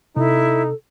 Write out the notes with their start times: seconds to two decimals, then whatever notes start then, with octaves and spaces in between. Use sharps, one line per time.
0.16 C3 C4 D#4 E4 A4